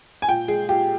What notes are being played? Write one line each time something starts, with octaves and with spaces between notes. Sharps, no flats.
G#5
A#2 G5
G#3 G#4
A#2 G4